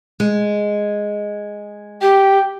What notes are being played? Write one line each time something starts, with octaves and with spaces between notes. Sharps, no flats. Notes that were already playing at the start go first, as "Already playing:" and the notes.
G#3
G4 G5